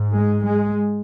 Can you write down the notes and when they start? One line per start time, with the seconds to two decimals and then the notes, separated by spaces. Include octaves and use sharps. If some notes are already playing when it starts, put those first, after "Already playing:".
Already playing: G#2
0.15 G#3
0.45 G#3